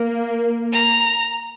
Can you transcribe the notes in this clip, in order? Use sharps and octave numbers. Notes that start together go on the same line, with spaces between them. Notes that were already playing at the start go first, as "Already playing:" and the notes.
Already playing: A#3
A#5